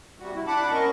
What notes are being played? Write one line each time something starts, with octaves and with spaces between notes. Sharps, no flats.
C3 G3 F#4
E4
D4 F#5 A5 B5 D6
C#4 A#4 D#5 C#6